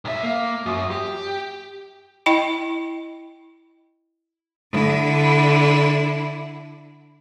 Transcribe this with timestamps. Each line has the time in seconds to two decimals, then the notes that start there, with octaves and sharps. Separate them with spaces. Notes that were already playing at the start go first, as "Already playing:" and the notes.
0.05 B1 E5
0.23 A#3
0.66 F#2
0.91 G4
2.26 E4 D#5 G5 B5
4.71 D3 E4